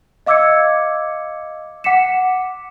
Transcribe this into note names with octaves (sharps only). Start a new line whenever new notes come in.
D#5 F5 D6 E6 G#6 C#7
F#5 D6 B6 C#7 E7